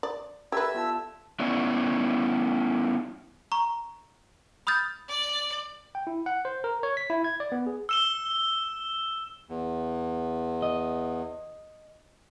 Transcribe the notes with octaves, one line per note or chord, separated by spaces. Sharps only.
D5
G4 A4 B4 D5 E5 E6 G#6
B3 F4 A5
B3 C#4 E4 D5
A#5 C#6
B5 D#6 F6 G6 A6
D5
G5
E4
F#5
C5
A#4
C#5
B6
E4
G#6
D5
B3
G#4
E6 E7 G7
E2
D#5